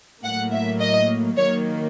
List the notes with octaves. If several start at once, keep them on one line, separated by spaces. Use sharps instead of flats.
A2 F#3 A#3 F#5
E5
D#5
D#3 F#3 A#3 C#5